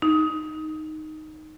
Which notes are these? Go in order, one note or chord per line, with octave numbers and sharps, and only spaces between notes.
D#4